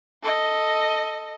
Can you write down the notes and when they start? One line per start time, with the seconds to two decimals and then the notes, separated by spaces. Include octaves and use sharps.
0.23 A4 D#5